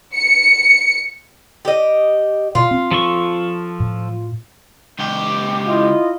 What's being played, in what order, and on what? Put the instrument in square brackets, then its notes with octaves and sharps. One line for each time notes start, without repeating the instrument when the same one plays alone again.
[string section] C#7
[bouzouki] G4 D#5
[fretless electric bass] B2 [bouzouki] F4
[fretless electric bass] C4
[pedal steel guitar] F3 A4 C#6
[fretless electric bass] A2
[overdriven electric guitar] C#2 G4
[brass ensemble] E4 F4 D#5